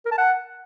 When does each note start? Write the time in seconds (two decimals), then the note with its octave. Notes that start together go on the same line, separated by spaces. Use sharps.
0.05 A#4
0.12 A5
0.18 F#5